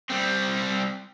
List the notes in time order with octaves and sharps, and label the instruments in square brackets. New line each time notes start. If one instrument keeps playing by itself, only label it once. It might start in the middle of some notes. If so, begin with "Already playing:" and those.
[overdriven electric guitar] G3 C4